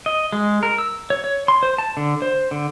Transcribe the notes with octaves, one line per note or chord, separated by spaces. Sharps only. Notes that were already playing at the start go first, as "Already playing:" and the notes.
D#5
G#3
A#4
E6
C#5
C#5
C6
C5
A5
D3
C5
D3